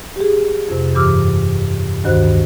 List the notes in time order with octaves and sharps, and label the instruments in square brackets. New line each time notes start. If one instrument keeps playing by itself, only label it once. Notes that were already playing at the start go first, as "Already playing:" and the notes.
[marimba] G4 G#4
F2 C3
G2 E3 G4 D6 E6 F6
D2 G2 D#3 F#4 C5 F#6